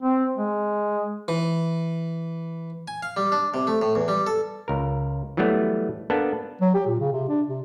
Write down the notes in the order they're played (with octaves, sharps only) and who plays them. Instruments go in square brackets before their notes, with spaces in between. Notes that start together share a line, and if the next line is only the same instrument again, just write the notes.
[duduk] C4
G#3
[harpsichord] E3
G#5
F5
G3
D4
C3
A3
A2
E2
G3
A4
[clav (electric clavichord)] C#2 A#4
E3 F#3 G3 A3 B3
A#3 B3 D4 A4
[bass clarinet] F#3
G4
A#2
C#3
C3
D4
C3